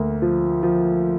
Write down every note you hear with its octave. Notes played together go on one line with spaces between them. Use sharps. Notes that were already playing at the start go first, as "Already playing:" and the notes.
Already playing: D2 A#3
F3
F3